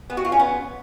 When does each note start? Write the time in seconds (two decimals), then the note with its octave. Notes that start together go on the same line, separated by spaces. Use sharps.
0.10 B3
0.17 F#4
0.25 F4
0.32 C#4
0.39 B3